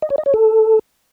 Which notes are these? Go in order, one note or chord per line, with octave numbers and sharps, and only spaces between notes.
D#5
C#5
D#5
C#5
A4